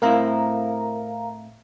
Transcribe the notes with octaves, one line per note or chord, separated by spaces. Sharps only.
A2 C4 E4 A#4 F5 A#5